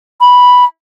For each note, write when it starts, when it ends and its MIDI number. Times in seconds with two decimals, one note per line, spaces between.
0.21 0.64 83